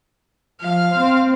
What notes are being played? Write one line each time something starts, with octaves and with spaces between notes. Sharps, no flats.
F3 F5
C4 C5